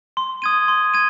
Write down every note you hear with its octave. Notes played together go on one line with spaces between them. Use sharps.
C6
D#6 G#6 D#7
C6
G#6 D#7